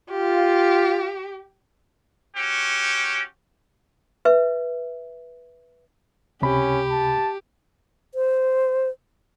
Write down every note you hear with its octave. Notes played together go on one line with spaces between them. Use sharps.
F4 G4
C#4 F#4 G4
B4 E5
C#2 C3 C#4 G4 B5
A5
C5